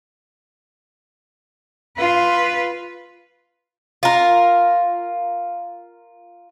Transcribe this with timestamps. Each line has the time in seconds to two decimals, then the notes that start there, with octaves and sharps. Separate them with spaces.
1.97 F4 B4
4.03 F4 A#4